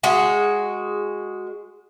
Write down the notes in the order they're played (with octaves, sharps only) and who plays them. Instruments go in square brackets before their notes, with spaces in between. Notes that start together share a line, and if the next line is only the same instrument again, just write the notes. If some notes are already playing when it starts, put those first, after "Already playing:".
[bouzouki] G#3 F#4